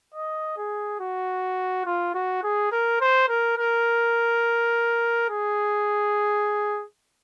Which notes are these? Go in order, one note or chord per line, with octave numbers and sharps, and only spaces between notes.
D#5
G#4
F#4
F4
F#4
G#4
A#4
C5
A#4
A#4
G#4